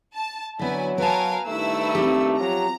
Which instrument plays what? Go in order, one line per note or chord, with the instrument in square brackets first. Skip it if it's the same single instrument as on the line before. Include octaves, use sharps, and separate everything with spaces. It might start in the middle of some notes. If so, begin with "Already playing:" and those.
[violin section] A5
[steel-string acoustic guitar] D3 B3 [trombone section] F#3 [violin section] E4 B4 G#5
[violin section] A#4 F5 G#5 [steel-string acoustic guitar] B4 A5
[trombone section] G2 D#3 A3 [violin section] E4 E6
[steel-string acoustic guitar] C4 G4
[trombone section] F3 F#3 [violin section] A#5